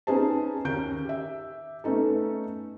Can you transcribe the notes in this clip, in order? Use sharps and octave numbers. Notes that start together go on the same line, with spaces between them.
B3 C#4 D#4 G#4 C5 A5
D#2 C#4 A#4 G6 D7
G4 E5
A3 B3 C#4 D#4 A4